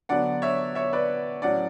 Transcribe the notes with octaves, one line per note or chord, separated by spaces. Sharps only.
D3 F#3 B3 D4 D5 F#5
C#5 E5
C#5 E5
B4 D5
A2 F#3 C#4 D5 F#5